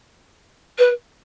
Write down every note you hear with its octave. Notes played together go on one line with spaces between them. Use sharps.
B4